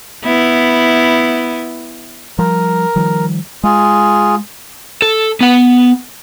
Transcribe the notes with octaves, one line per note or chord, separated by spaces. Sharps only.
B3 E4
F3 G3 A#4
D#3 F3 G3
G#3 F4 G#4
A4
B3 F#5